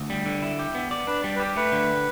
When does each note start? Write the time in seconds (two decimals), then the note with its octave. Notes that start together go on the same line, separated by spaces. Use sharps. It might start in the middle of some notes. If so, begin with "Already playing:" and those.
Already playing: D2
0.10 G3
0.26 D3
0.42 E4
0.59 G4
0.75 B3
0.91 D5
1.07 D4 B4
1.21 G3 D5
1.36 B4
1.40 G4
1.56 A3 B4
1.72 D3